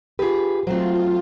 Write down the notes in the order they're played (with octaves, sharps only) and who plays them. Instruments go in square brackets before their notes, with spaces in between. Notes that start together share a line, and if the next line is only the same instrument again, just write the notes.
[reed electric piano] F4 G4 [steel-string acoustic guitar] G#4 B4
[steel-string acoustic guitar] F#3 A3 C4 [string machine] F4 [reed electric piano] C5